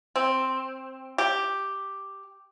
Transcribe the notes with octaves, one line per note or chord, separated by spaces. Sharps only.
C4
G4